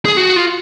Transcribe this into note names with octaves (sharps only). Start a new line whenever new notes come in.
G#4
F#4
F4